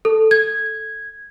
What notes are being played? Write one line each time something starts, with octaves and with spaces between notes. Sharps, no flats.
A4
G#6